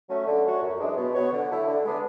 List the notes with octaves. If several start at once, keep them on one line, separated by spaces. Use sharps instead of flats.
F#3 A3 C#4
D3
A3 C#4 F#4 C#5
F#2
E3 G#3 D4
B2
F#3 B3 F#4 C#5
D3
A3 E4
D3
G#3 B3 D4